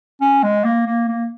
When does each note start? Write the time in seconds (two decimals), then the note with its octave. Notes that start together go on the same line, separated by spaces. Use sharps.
0.21 C#4
0.43 G#3
0.65 A#3
0.87 A#3
1.08 A#3